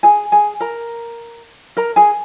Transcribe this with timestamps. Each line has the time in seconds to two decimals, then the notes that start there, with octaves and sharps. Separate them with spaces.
0.03 G#4 G#5
0.32 G#4 G#5
0.60 A#4 A#5
1.77 A#4 A#5
1.96 G#4 G#5